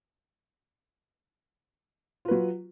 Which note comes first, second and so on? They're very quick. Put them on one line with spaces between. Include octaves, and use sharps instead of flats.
F4 B4 F#3